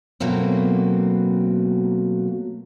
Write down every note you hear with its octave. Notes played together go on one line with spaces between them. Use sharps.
B2 F#3 A3 A#3 C4